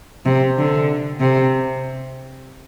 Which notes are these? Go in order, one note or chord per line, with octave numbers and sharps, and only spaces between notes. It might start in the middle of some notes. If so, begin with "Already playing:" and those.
C3
D3
C3